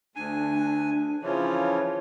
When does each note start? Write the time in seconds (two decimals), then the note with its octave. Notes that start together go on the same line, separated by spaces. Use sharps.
0.16 D2 D4 G#5
1.23 C#3 E3 F3 C#5